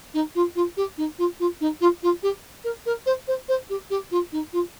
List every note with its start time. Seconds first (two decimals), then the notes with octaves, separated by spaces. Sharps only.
0.14 D#4
0.35 F4
0.55 F4
0.77 G4
0.97 D#4
1.18 F4
1.39 F4
1.61 D#4
1.81 F4
2.03 F4
2.23 G4
2.64 A#4
2.86 A#4
3.06 C5
3.28 C5
3.48 C5
3.69 G4
3.90 G4
4.11 F4
4.32 D#4
4.53 F4